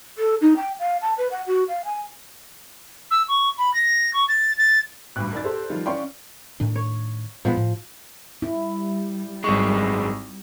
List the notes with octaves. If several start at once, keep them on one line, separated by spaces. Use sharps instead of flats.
A4
D#4
G5
F5
A5
B4
F#5
F#4
F5
G#5
E6
C#6
B5
A#6
C#6
A6
A6
A1 D2 G2 F#6
F#2 D#3 A#4 D5 A6
G4 A4 C5
D#3 F3 G3 F4
E3 C#4 C#5 D5 F5 G5 C6 C#6
A2 D#3 D4
C#5
A#2 F3 G#3 B3
A2
G3 E4
G#1 F#2 G#3 C#6